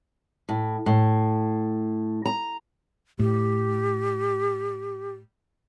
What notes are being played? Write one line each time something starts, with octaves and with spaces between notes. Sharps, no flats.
A2
A2
A#5
A2 G4